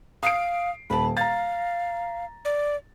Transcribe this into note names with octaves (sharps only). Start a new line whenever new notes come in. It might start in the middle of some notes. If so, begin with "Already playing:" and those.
F5 D#6 C7 D7
D#1 A5 B5
F5 A#5 A6
D5